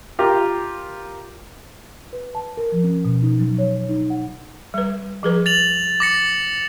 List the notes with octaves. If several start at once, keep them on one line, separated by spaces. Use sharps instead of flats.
F4 G4 A#4
B4
A5
A#4
F3
C#4
B2
D#4
F#3
C#5
D#4
F#5
G3 B4
F3 G#4 B4
A6 F7 F#7
D6 A#6 C#7